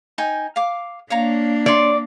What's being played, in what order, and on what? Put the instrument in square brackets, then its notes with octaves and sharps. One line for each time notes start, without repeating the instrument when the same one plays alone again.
[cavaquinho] D#4 G5 G#5
F5 D6
[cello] A#3 D4 [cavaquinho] C#5 F5 A#5
[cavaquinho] C#5 C6 [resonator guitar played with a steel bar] D5